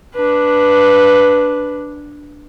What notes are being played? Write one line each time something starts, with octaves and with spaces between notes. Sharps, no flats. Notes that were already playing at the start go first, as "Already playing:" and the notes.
D4 B4